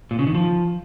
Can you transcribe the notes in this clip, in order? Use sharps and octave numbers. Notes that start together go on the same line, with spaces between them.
A#2
C#3
D#3
F3